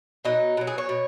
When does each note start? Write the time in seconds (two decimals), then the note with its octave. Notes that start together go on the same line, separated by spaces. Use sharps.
0.25 B2 F#3 D#4
0.57 B2 F#3
0.67 G#4
0.78 C#5
0.89 B2